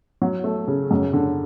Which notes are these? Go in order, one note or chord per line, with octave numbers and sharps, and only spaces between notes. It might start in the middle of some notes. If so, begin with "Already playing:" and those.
F#3
A3
C#3
F#2
D3